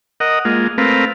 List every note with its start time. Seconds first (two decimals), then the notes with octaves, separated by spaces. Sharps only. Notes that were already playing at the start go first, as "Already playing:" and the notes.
0.20 A#4 D#5 F#5
0.45 G#3 A#3 F4
0.78 A3 C4 A#4 B4 F5